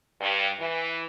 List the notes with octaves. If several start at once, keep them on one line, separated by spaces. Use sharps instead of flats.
G2
E3